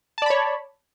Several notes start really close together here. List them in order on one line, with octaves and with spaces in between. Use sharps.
A5 D5 B5 C#5